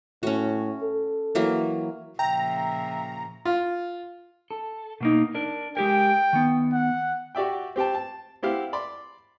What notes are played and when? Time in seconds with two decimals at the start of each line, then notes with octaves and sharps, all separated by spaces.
0.23 A2 C#4 F#4
0.82 A4
1.35 E3 F#3 A#3
2.19 A#2 C#3 F3 E5 G5 A#5
3.45 F4
4.51 A4
5.01 B2 A#3 D#4
5.35 D4 A#4
5.77 G#3 G4 A#4 G5
6.33 D#3 B3
6.73 F#5
7.35 F#4 G4 D5 E5 G5
7.76 C4 G4 G5 A5
7.95 A5
8.43 C4 E4 G4 F5 F#5
8.73 D5 B5 C6 D6